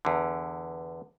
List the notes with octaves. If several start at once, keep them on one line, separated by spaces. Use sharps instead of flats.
E2 D3